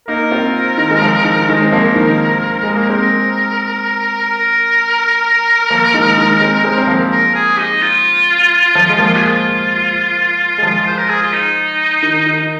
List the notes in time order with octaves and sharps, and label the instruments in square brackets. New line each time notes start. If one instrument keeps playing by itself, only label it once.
[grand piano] A#3 D#4 [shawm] A#4
[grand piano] C4 F4
D#3
G#3
F3
D#3
[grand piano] D#3 G#3 [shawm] A#4
[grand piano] C4
F3 A#3
D#3
G#3
A#3
[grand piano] G#3 C4 [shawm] A#4
[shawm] A#4
[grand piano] F3 A#3
D#3 G#3
D#3 G#3
G#3 C4
G#3 C4
C4
F3 A#3
[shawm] A#4
G#4
D#4
F4
[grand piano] F3
G#3
F3 A#3
[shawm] G#4
F4
[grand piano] G#3
F3
[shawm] C5
A#4
G#4
F4
D#4
[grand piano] D#3
D#3